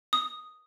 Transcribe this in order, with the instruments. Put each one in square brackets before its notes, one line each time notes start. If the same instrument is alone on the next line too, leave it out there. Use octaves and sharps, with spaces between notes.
[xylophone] D#6